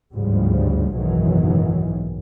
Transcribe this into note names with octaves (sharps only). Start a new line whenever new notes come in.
G1 D2 G#2 C#3 F3 G3
F#1 B1 G#2 D#3 E3 F#3